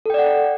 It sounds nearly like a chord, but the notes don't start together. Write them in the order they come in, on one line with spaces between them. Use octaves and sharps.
A4 G5 D5 F#5